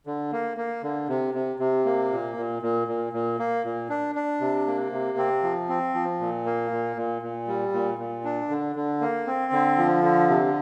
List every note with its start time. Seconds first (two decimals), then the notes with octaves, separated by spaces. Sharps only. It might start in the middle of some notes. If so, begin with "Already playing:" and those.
0.07 D3
0.32 A#3
0.57 A#3
0.83 D3
1.09 C3
1.34 C3
1.59 C3
1.85 A#3
2.11 A#2
2.37 A#2
2.62 A#2
2.88 A#2
3.13 A#2
3.39 A#3
3.64 A#2
3.90 D4
4.15 D4
4.41 C3
4.67 A#3
4.92 C3
5.18 C4
5.43 F3
5.69 C4
5.94 F3
6.20 A#2
6.46 A#3
6.71 A#2
6.97 A#2
7.22 A#2
7.47 G3
7.73 A#2
7.98 A#2
8.24 D4
8.50 D3
8.76 D3
9.01 A#3
9.27 C4
9.52 D3
9.78 F3
10.03 D3
10.29 C3